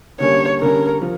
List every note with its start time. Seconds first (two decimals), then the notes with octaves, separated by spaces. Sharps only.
0.20 D3 G3 A#3 C#4 C#5
0.61 D3 G3 C#4 A#4
1.02 F3